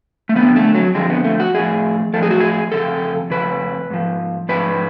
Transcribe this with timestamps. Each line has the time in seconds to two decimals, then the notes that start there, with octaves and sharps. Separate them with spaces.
0.29 A3
0.35 F2 D3 F3 B3
0.56 A3
0.75 F#3
0.95 F2 D3 F3 G#3
1.10 B3
1.24 A3
1.40 F#4
1.54 A2 F3 G#4
2.13 A2 F3 A4
2.23 G#4
2.31 F#4
2.40 G#4
2.72 F2 C#3 A4
3.30 F2 C#3 B4
3.90 G#2 F3
4.49 G#2 F3 B4